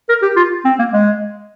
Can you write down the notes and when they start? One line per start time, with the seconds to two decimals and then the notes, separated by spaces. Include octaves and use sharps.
0.09 A#4
0.23 G4
0.37 F4
0.65 C4
0.79 A#3
0.93 G#3